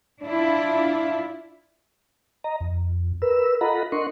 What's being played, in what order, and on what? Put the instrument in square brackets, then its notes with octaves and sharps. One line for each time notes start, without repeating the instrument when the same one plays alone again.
[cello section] D4 E4 F4
[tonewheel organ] D#5 A#5
F2
A#4 B4 E6
F4 A4 D#5 F#5 A#5 B5
D4 A#4 D#5 F#5 C6 C#6